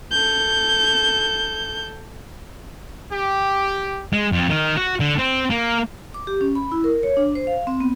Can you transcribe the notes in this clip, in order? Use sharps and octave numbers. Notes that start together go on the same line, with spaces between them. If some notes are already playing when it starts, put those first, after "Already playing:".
A4 G6
G4
G#3
F2
D#3
F#4
D3
C4
A#3
D6
G4
C#4
B5
E4
A#4
C#5
D4
C5
F5
C4
B3